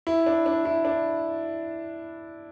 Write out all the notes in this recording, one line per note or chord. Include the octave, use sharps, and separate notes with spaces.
E4
D4
D4
E4
D4